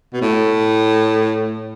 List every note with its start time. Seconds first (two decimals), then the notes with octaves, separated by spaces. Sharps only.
0.13 B2
0.21 A2